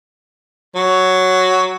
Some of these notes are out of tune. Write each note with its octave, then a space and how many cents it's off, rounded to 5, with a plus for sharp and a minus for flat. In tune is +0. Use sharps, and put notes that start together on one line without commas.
F#3 +5